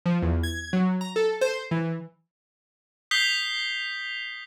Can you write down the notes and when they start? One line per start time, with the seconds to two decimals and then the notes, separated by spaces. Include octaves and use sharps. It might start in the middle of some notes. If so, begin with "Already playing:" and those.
0.06 F3
0.22 E2
0.43 G#6
0.73 F#3
1.01 A#5
1.16 A4
1.41 C5
1.71 E3
3.11 D#6 G6 B6 C7 F7 G7